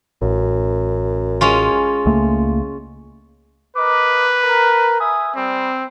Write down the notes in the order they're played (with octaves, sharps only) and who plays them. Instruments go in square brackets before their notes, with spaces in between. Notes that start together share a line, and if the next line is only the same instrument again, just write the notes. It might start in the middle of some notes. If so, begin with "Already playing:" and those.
[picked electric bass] A1 [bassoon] F#2
[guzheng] G#3 C#4 F4
[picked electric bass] C#2 A3 A#3
[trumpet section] A#4 D#5 D6 [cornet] B4
[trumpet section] A#4
E5 G#5 D#6
[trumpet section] G3 [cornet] C4